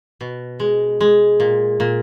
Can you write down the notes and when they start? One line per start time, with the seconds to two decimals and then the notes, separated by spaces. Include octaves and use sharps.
0.21 B2
0.60 G#3
1.01 G#3
1.40 A#2
1.80 A#2